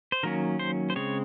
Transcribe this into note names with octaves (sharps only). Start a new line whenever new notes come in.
C5
D#3 F#3 A#3 C#4 A#4
C5
C5
C#3 G#3 C4 C#5